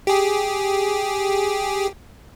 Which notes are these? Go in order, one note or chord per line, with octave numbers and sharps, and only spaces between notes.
G4 G#4